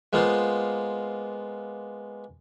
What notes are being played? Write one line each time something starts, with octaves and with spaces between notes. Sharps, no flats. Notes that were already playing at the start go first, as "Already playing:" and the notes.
G#3 A#3 B3 F4 C5